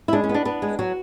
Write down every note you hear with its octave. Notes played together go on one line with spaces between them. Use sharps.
E4
G#3 D4
C#4
B3
D4
B3 D4
G#3
F#3 F#4